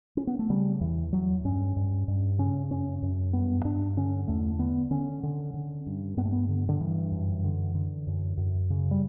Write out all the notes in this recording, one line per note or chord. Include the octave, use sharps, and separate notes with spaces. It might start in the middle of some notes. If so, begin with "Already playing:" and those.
C#4
B3
A3
C#3 G3
E2 E3
E2 F#3
G2 C#4
G2
G2
C#3 C#4
F#2 C#4
F#2
G2 B3
G2 D4
D3 C#4
E2 A3
D3 B3
D3 C#4
D3
D3
G2
G2 B3
A3
B3
D3
D3
G2 E3
F#2
D3
D3
F#2
F#2
C#3
G3